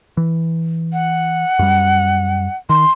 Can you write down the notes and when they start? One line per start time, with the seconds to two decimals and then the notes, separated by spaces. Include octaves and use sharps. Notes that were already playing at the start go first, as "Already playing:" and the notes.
0.17 E3
0.93 F#5
1.59 F#2 G3
2.69 D#3 C6